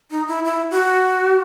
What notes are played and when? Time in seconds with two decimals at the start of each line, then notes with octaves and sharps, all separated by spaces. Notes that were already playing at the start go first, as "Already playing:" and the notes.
0.11 D#4
0.28 E4
0.45 E4
0.71 F#4